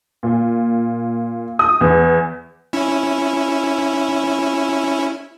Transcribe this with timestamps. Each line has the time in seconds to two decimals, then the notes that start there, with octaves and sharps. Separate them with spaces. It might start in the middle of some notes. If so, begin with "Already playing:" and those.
0.23 A#2
1.59 D#6
1.81 E2
2.73 C#4 E4